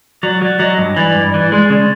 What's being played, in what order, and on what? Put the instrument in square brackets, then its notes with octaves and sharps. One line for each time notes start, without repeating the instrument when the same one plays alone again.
[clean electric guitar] F#3 [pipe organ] D5
[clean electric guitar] F#3
[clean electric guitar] F#3 [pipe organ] D#5
[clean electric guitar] G2
[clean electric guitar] E3 [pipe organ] D5
[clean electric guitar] G2
E3
G#3
C#3